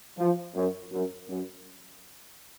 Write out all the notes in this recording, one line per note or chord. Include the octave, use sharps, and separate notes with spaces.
F3
F#2
F#2
F#2